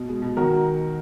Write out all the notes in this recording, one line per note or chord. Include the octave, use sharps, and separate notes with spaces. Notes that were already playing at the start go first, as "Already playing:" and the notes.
Already playing: B2
G#3
B2
D#3 F#4 A#4